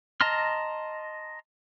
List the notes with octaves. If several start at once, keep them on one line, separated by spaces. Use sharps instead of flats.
D#5 A5 A#5 C6 F6